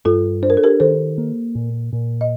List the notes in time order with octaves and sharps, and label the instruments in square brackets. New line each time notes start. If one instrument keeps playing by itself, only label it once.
[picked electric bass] G2 [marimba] F4 A4
[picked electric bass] D4 [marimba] C5
[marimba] A#4
A4
G4 A#4
[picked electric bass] D#3 [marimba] A4 C5
[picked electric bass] A#3
A#2
A#2
[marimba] D#5